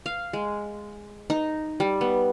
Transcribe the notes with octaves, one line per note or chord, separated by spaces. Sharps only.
F5
G#3
D#4
G3
B3